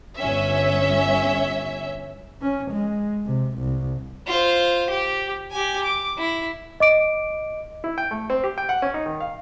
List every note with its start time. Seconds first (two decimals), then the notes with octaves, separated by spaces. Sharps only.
0.17 G1 C#4 E5
2.42 C#4
2.71 G#3
3.26 C3
3.59 C2
4.27 F4 C5
4.90 G4
5.51 G4 G#5
5.84 D6
6.18 E4
6.80 D#5 D6 D7
7.84 E4
7.98 G5
8.11 A3
8.30 C4
8.44 G4
8.58 G5
8.69 F#5
8.82 C#4
8.94 D#4
9.06 D#3
9.21 F5